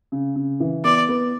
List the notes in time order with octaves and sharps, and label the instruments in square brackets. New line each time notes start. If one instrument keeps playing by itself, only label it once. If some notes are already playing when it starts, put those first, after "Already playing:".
[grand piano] C#3
C#3
E3
[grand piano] B3 [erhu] D5
[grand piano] B3